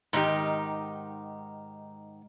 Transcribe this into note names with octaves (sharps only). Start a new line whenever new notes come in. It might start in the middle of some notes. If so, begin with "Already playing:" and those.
G#2 D#3 D#4 G4